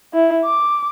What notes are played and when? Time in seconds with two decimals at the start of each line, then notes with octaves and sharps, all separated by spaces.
0.14 E4
0.45 D6